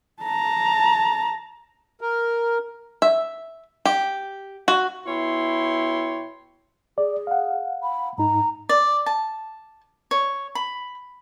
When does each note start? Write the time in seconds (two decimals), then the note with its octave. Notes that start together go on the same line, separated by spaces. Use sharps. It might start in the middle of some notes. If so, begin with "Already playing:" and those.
0.22 A5 A#5
2.01 A#4
3.02 E5
3.85 G4
4.68 F#4
5.07 B2 E4 C#5 G5 C6
6.98 G#4 D5
7.27 F5 F#5
7.83 B5
8.18 G#2 D#4 A#5
8.69 D5
9.06 A5
10.11 C#5
10.55 B5